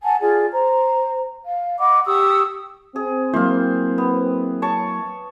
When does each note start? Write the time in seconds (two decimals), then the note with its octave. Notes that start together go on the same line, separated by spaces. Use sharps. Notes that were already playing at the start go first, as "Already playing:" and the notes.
0.03 F#5 G#5 A5
0.21 F4 G#4 D5
0.52 C5 A#5
1.45 F5
1.79 D#5 F#5 B5 D6
2.06 G4 C#6 D#6 E6
2.96 C4 G#4
3.34 F#3 A#3 E4 C5 F5
3.98 B3
4.62 C#5 A5 C#6